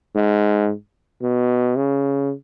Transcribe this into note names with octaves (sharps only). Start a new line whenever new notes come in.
G#2
B2
C#3